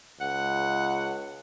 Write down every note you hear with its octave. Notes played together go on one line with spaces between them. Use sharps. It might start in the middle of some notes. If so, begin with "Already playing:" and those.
C#2 F#5